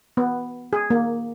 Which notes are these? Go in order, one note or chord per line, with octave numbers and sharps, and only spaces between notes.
B3
G#4
A#3